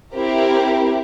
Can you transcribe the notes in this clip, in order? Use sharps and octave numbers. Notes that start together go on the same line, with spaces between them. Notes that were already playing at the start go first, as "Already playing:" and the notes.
C4 E4 G4 A#4